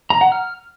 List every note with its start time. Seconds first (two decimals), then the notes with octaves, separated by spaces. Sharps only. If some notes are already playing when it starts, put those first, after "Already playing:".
0.10 A#5
0.21 F#5
0.32 F6